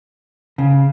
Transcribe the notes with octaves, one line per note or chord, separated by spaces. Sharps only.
C#3